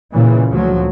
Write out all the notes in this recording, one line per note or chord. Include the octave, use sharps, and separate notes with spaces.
A#2 C#3 E3
D2 F3 F#3